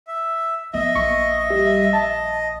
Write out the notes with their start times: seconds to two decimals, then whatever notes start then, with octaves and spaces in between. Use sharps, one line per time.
0.08 E5
0.74 F3 B3 D#5 E5
0.95 A#1 C#6
1.50 G3
1.93 A5